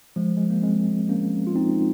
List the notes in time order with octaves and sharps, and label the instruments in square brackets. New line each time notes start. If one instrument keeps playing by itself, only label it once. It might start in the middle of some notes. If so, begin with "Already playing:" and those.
[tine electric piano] F3 G#3
G#3
A#3
G#3 C4
A#3 C#4
F4
C4 D#4